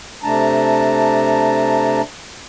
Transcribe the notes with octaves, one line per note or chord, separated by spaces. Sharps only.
C3 A3 D4 A5 A#5